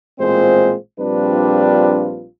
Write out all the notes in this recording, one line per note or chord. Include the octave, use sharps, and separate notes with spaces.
A1 A#2 G#3 C4 F4 C5
A#1 G3 C4 D4 F4 B4